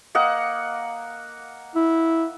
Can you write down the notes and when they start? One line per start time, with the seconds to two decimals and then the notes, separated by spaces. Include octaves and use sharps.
0.15 A#3 D#5 F#5
1.75 E4